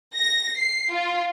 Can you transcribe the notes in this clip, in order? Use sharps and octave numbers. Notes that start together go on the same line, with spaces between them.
A#6
C7
F4